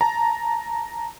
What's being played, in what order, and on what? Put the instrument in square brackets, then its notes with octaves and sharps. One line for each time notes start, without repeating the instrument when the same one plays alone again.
[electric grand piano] A5 A#5